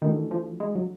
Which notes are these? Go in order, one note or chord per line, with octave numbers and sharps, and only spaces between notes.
D#3 E3 A3 D4 F#4 A4
F3
G#3
F#3